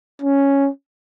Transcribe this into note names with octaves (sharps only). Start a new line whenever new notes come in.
C#4